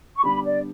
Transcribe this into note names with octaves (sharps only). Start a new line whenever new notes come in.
C#6
D3 G3 B3 D4 G4 B5
D5